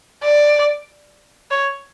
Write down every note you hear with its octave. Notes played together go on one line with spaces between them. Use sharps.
D5
C#5